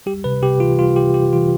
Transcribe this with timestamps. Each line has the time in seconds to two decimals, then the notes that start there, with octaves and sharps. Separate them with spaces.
0.06 G3 G4
0.24 C3 B4
0.42 C3 G4
0.60 E3 F4
0.79 G3 F4
0.96 C3 G4
1.14 C3 G4
1.33 E3 F4